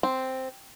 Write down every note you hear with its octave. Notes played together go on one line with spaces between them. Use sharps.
C4